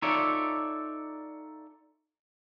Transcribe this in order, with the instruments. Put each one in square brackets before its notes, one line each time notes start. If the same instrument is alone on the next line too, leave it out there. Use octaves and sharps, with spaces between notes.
[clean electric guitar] D#4 F4 A4 C#5 D5 E5